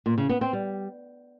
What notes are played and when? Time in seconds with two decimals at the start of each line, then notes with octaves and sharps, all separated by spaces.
0.06 A#2
0.18 C#3
0.29 B3
0.41 C4
0.53 G3